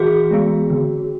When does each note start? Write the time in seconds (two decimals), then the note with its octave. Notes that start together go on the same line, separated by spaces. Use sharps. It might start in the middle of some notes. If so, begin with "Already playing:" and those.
Already playing: E3 F#4 G#4
0.31 G#3 B3
0.70 D3